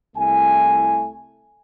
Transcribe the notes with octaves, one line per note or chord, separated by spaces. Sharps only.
C2 A3 E4 G#5